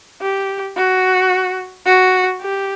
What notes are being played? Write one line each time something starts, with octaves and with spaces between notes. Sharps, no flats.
G4
F#4
F#4
G4